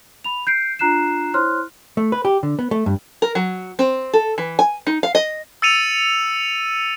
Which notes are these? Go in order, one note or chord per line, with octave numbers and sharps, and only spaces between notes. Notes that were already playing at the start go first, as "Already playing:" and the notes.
B5 F7
G6 C7 D7
D4 F4 A#5 F#6 C7 E7
E4 C5 C#5 C6 F6 F#6
A3
B4
G4
D3
B3
A3
G2
A#4
F#3
C4
A4
E3
G#5
D#4
F5
D#5
E6 A6 C#7 D#7 F7